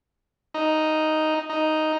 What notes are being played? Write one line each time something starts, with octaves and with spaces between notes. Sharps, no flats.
D#4
D#4